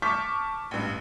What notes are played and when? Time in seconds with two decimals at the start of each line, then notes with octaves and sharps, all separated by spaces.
0.02 A5 C#6 D6 F6 G6 B6
0.71 A1 G2